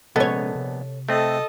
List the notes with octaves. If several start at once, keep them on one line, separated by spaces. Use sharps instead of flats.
A#1 C3 G#3 B3 C#4 A4 C#5 D#5
C3
A3 C4 A4 D#5